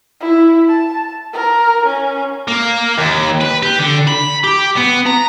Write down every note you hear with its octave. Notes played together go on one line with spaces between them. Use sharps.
E4
A5
A#4
C#4
A#3
D#2
B4
G4
D3
B5
G4
B3
A#5